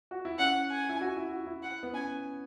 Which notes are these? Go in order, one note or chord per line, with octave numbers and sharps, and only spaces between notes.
F#4
E4
C#4 F#5
G#5
E4
F#4
E4
F#4
E4
F#5
B3
C#4 G#5